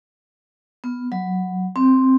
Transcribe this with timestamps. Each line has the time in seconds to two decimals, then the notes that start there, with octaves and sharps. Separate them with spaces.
0.84 B3
1.12 F#3
1.76 C4